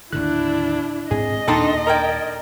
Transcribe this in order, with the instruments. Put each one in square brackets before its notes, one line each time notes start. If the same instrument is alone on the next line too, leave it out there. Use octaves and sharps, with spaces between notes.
[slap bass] D#2 A2 D3 [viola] D4 E4 [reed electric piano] F#6
[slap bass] G#2 C4 [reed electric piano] G#4 [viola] D#5
[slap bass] D#2 A#2 [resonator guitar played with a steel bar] D4 D#4 A5 [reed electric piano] A4 G5 C6
[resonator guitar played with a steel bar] A#4 D5 G5 [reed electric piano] A#5 G#6